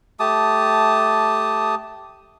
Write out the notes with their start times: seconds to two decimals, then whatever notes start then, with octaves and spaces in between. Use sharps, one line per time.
0.20 A3 G4 A5 D#6